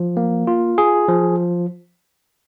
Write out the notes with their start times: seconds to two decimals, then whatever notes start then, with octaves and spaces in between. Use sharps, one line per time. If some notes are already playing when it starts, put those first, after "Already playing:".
Already playing: F3
0.17 A#3
0.47 F4
0.78 G#4
1.08 F3